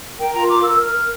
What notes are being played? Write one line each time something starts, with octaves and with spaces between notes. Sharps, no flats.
A#4 G5
F4 A#5
A#4 D6
A#4 E6
A#4 F6
A#4